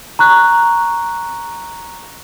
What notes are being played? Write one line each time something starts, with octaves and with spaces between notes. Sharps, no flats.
A#5 C#6 F#6